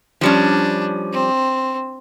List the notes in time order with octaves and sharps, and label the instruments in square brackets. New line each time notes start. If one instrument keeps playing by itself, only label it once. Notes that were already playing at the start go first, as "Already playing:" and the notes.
[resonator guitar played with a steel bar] F3 G3 C#4 [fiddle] D4
[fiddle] C4